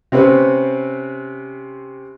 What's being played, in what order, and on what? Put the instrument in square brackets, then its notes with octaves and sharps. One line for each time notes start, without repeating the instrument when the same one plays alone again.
[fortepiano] C3 C4 C#4 B4